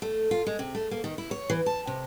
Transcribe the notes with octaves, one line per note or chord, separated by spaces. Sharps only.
A3
F4
G#3
C3
A3
A#3
D#3
E4
C#5
E3
A5
C3